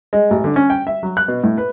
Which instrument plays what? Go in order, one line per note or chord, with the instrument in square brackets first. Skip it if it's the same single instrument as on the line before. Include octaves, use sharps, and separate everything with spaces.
[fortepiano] G#3
A1
D3
C#4
G5
E5
F#3
F#6
B2
A2
B4